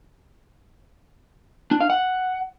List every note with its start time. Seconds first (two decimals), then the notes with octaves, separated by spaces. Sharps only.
1.71 D4
1.80 F5
1.90 F#5